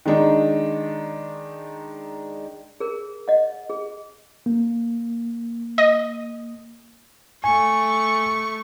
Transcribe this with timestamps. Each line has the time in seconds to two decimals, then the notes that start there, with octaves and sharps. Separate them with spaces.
0.06 D#3 G#3 D4 D#4
2.80 G#4 A#4
3.28 D#5 F#5
3.70 G#4
4.46 A#3
5.78 D#5
7.44 A3 G#5 C#6